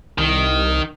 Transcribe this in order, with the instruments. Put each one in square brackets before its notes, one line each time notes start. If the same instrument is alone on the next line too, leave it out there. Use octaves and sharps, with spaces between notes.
[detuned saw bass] C2 [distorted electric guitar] D#3